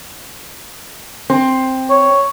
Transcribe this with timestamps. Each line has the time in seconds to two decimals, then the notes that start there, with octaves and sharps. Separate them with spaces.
1.30 C4
1.90 C#5